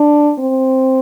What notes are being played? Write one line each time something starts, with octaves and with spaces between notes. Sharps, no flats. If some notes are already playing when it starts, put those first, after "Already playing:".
Already playing: D4
C4